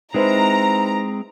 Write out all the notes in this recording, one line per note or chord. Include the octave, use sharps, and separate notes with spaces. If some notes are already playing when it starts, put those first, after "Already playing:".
G#3 C4 D#4 E4 B4 C5 A#5